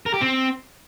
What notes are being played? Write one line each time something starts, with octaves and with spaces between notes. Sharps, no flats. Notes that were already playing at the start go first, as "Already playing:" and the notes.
A#4
G4
C4